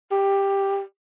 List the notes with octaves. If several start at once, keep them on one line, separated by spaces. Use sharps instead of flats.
G4